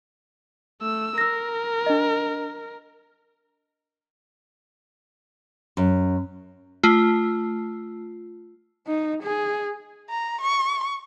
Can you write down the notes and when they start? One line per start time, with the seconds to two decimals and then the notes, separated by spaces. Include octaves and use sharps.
0.81 A3 E6
1.18 A#4 E6 A#6
1.86 D4 D#5
5.77 F#2
6.83 A3 F4
8.87 D#4
9.23 G#4
10.10 A#5
10.41 C#6